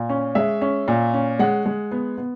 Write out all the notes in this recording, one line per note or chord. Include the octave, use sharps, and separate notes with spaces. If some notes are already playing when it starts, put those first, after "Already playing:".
Already playing: A#2
C#4
G#3 E5
C#4
A#2
C#4
G#3 F#5
G#3
B3
B3